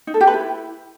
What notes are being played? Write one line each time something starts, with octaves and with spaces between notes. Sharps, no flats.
D#4
A4
G4
B4
E4